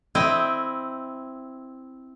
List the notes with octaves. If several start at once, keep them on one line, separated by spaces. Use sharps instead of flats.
C4 E4 D#5 G5